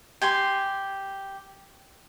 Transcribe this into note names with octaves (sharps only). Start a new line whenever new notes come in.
G4 G#5 C6